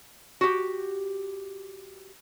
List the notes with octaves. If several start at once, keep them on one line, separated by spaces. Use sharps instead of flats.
F#4 G4